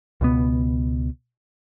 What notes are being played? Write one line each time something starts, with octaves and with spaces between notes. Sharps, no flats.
C#2 B2 B3